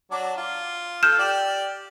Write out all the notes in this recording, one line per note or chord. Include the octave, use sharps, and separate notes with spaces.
F#3 D4 D6
F4
F4 A4 F6 G6 E7
G4 D5